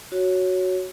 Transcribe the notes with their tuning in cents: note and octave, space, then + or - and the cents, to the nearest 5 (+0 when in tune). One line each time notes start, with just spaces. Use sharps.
F#4 +0 C#5 +0